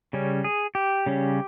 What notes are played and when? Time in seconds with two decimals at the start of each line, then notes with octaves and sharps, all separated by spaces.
0.13 C#3 G3 C#4
0.44 G#4
0.75 G4
1.06 C#3 G3 C#4